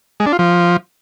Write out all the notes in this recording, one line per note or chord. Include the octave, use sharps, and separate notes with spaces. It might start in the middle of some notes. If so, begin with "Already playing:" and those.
G#3
D4
F4
F3